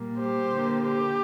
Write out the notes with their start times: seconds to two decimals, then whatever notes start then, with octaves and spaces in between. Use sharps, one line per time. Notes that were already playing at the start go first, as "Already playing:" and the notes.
Already playing: A#2 G3 A#3
0.19 G4 C5
0.52 D3 A#3
0.85 G4